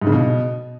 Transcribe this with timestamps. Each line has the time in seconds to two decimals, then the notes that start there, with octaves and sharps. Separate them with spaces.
0.02 G#2
0.07 C#3
0.12 B2